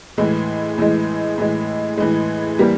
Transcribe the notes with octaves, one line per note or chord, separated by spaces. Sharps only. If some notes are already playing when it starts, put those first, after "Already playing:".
A2 E3 G#3
A2 E3 G#3
A2 E3 G#3
A2 E3 G#3
E3 G3 A#3